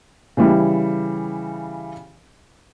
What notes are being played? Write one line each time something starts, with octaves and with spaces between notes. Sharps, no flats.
C#3 E3 G3